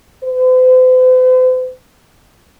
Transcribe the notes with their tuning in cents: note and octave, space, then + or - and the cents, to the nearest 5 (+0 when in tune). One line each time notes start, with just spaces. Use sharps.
C5 -45